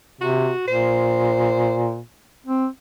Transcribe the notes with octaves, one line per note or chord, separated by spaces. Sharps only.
C3 F#4
A#2 C5
C4